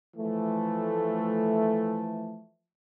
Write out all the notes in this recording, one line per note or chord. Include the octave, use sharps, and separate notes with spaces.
E3 F3 A3